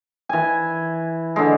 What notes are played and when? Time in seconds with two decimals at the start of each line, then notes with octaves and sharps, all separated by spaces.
0.29 E3 G#5
1.36 D3 G#3